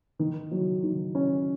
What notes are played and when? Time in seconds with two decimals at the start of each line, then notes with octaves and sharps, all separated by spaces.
0.19 D#3
0.51 F#3
0.83 D#3
1.15 C#4